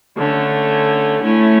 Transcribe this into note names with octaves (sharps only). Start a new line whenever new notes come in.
D3 A3 C#4
A3 C#4 E4